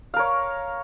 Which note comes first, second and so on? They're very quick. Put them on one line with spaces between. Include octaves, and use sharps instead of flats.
F5 A#4 C#5